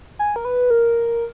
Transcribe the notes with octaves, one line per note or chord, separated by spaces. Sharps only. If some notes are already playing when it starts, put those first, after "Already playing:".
G#5
A#4
B4
A#4